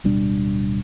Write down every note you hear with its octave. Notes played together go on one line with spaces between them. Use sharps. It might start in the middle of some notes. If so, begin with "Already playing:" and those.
D1 B2 G3 D4